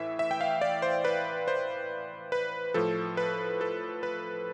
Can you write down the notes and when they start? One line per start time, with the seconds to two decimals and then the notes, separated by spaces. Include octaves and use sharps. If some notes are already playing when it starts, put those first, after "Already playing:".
Already playing: A2 E3 E5
0.19 E5
0.31 G5
0.41 F5
0.61 D5
0.82 C5
1.05 B4
1.48 C5
2.32 B4
2.74 A2 F3 A4
3.17 B4
3.61 A4
4.03 B4